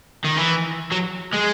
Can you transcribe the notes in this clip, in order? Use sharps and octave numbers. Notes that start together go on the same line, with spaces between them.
D#3
E3
F#3
G#3